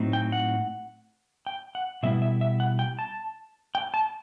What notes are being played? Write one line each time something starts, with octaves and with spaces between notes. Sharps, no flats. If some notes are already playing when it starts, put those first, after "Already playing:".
Already playing: A2 F#3 C4 D#4
G5
F#5
G5
F#5
B2 G3 B3 E4 E5
E5
E5
F#5
G5
A5
G5
A5